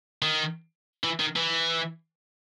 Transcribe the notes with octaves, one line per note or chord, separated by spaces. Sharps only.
D#3
E3
D#3
E3